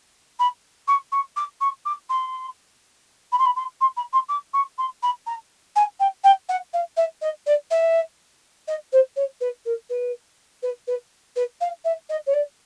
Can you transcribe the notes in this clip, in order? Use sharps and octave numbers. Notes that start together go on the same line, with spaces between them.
B5
C#6
C#6
D6
C#6
D6
C6
B5
C6
B5
C6
C6
B5
C6
D6
C#6
C6
B5
A#5
G#5
G5
G5
F#5
F5
E5
D#5
D5
E5
D#5
C5
C#5
B4
A#4
B4
B4
B4
B4
F5
E5
D#5
C#5
D5